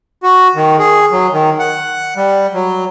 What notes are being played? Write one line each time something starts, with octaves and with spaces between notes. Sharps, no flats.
F#4
D#3
G#4
F#3
D#3
F#5
G3
F#3